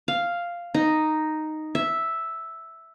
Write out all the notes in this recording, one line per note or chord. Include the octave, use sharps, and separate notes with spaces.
F5
D#4
E5